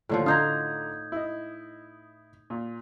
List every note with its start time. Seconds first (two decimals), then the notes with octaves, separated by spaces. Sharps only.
0.09 D#2 A2 D3 F3 C#5
0.26 D3 D#4 F4 A#5 D#6 G6 G#6
1.12 E4 D#5
2.50 A#2